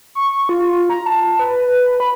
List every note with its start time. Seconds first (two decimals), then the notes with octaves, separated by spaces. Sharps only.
0.15 C#6
0.49 F4
0.89 A#5
1.06 A5
1.39 B4
2.00 B5